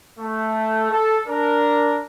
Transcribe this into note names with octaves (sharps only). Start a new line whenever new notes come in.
A3
A4
D4 A#4